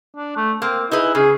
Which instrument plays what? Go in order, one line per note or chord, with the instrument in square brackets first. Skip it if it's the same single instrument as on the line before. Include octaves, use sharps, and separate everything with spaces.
[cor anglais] D4
A3
[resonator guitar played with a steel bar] A#3 [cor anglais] C4
[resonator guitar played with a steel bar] D#4 G#4 B4 [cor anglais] E4
[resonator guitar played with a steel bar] C#3 [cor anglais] G#4